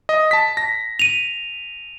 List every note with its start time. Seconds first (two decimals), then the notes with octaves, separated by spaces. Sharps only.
0.09 D#5
0.31 A5 B6
0.57 A#6
0.99 D#7 F7